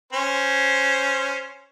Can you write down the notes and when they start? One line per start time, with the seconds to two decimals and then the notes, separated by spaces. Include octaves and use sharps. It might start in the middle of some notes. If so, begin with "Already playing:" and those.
0.13 C#4 C5